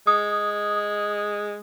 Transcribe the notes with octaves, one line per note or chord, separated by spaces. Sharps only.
G#3 D#6